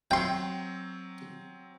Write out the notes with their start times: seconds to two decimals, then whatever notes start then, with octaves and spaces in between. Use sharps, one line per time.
0.11 F#3 C4 G5 C6